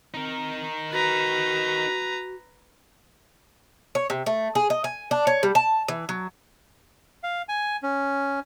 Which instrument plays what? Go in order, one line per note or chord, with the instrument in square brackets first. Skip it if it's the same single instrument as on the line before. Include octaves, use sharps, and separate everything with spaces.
[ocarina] C4 [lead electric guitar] D#4 A#4
[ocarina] F#4 [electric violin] B4 A#5
[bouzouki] C#5
C3
A3
G#4
D#5
G#5
D4
C#5
G3
A5
E3
F#3
[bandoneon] F5
G#5
C#4